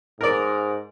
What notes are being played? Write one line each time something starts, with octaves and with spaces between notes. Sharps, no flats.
G#2 A#4 D5